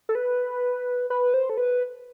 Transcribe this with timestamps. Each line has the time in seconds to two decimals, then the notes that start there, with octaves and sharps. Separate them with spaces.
0.09 A4
0.15 B4
1.10 B4
1.34 C5
1.50 A4
1.58 B4